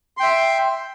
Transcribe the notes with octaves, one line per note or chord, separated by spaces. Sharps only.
E5 G5 C6